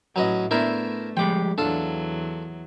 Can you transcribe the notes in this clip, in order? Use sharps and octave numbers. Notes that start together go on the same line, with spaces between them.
A2 F#3 C#4 B4 D#5
A3 B3 D4 E4 A#4 C5
F3 G3 G#3 G5 D6
E2 F#3 D4 F4 A4